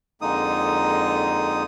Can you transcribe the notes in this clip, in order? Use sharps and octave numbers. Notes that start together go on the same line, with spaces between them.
F2 D3 G#3 A#3 D#4 D#6